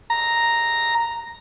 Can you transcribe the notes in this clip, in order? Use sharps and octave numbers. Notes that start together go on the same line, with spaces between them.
A#5